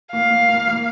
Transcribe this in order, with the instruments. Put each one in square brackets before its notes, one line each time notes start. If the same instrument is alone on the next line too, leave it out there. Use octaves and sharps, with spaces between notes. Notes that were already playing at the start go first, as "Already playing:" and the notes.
[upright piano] A#3 [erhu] F5
[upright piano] A#3
A#3
A#3